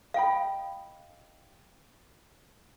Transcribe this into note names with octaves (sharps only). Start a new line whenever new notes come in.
D#5 F5 G5 B5